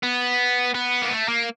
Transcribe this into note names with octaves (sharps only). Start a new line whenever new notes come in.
B3
B3
A#3
A3
A#3